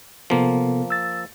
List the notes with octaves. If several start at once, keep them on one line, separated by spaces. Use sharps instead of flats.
C3 F3 A#3 B3 A4
E6 A6